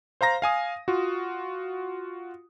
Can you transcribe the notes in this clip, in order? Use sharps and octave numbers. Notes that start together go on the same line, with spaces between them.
C5 F5 A#5 A#6
F5 G#5 D#6
F4 F#4